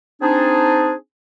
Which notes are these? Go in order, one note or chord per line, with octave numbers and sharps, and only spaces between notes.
C4 D4 D#4 G#4